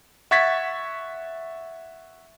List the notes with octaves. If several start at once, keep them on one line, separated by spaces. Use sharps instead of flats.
E5 F#5 C#6 G#6 A6 B6